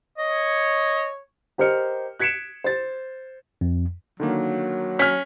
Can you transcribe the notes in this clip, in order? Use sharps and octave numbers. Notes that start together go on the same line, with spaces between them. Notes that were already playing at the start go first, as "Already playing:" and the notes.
C#5 D#5
G4 A#4 C5 D#5 F6 C#7
F#6 G#6 B6 C#7 D7 E7
C5 A6
F2
D3 D#3 F#3 A#3
C#4 F6 B6